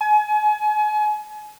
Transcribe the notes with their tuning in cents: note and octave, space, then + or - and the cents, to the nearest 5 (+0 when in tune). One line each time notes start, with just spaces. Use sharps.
G#5 +35